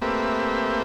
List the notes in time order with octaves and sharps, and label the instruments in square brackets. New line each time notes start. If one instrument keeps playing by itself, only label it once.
[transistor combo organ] A3 A#3 C4 G4 B4 E5